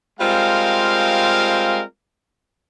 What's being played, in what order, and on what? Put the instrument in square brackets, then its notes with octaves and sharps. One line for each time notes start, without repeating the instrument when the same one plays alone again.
[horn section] G3 G#3 C4 F4 A#4 F5